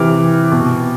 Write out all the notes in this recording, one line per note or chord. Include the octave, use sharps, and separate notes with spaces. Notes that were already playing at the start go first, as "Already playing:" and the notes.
Already playing: C3 E3 D6 F6
B2